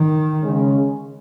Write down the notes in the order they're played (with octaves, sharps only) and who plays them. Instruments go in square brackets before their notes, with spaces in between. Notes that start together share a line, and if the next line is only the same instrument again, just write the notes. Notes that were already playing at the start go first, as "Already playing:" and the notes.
Already playing: [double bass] D#3
[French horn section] C#3 G#3 C#4